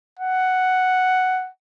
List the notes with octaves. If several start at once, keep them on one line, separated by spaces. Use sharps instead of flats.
F#5